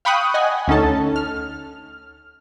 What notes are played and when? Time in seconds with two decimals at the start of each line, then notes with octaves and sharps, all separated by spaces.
0.05 F5 G5 B5 C#6 D#6 F#6
0.34 D#5 F#5 G#5
0.68 D2 C#4 D#4 A4 A5
1.16 F6